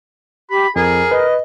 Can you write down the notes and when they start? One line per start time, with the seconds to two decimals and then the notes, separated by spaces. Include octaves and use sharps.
0.50 G4 B5
0.76 F2 G#4 A#4
1.11 B4 D#5